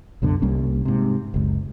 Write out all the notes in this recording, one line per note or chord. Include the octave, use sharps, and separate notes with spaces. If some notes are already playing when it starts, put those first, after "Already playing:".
C2 F#2 B2 D3
C2 G3 A#3 C#4
G#2 C3
F#1 C#2